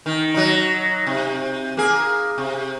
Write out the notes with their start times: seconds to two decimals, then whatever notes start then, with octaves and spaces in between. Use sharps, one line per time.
0.06 D#3
0.34 F#3 D#4
1.07 C3
1.77 A#3 G#4
2.38 C3